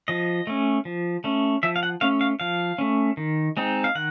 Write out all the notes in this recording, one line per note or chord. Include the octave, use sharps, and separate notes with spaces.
F3 D#5
A3 C#4
F3
A3 C#4
F3 E5
F5
F#5
A3 C#4 F5
F5
F3 F5
A3 C#4
D#3
G#3 C4 D#4
F5
D#3 F#5